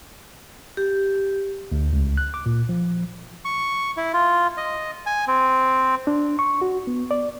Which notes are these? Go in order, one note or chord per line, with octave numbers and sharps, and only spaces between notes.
G4
D2
C#2
F#6
D6
A#2
F3
C#6
E4
F4
D#5
G#5
C4
D4
C#6
F#4
B3
D5